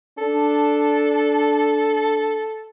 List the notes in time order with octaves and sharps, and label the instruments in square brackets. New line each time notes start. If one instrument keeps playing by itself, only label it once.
[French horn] D4 [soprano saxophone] A4